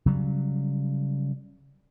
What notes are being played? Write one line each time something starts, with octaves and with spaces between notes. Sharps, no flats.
C#3 F#3 G3